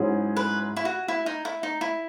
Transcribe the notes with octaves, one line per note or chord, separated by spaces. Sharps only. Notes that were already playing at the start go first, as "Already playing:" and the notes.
Already playing: G#2 F#3 C#4 E4 G#4
B4
E4
F#4
E4
D#4
E4
D#4
E4